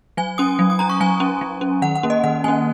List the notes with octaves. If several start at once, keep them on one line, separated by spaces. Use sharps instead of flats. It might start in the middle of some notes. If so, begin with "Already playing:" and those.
F#3 G#5
C#4 D#6
F#3
D#6
C#4 A#5
C#6
F#3 G#5
C#4
F#3
C#4
D#3 F#5
F#5
A#3 C#4
D#5
D#3 F#5
A#3 C#4 G#5